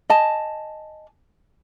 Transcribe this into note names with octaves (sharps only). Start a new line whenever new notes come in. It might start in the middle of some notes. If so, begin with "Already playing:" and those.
D#5 G#5 A5